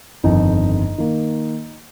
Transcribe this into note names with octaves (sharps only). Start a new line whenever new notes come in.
G1 F2 D#3 D#4
D#3 A#3